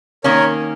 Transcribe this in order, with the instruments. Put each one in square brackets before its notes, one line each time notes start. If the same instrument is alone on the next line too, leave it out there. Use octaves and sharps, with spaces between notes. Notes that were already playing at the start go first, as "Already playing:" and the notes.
[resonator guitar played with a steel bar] D#3 A#3 C#4 [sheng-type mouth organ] A#4 C#5